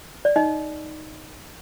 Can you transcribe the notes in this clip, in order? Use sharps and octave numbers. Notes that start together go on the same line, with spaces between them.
D5
D#4 D#5